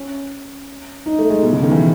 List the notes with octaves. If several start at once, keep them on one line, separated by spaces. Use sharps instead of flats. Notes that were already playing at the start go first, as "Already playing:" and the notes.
Already playing: C#4
D#4
A3
G#3
B2
C#3
D#3
E3